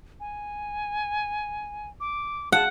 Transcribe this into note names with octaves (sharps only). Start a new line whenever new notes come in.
G#5
D6
F#5 A5